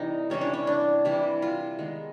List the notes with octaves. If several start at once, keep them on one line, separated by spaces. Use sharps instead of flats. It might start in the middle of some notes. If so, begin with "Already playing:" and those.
Already playing: C3 E3 G3 D#4
C3 E3 G3 C#4
D4
C#4
D4
C3 E3 G3 E4
F4
D#3 G#3 B3